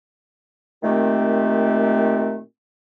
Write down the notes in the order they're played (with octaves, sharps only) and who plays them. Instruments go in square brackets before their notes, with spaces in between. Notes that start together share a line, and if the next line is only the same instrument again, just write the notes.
[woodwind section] A#2 D#3 A3 C4 G4